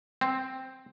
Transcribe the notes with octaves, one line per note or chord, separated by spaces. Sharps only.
C4